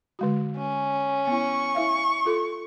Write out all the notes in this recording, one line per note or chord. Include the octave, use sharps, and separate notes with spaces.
D3 G#3 F#4
C#4
B3 E4 C#6
E4 E5 F5
F4 A4 C6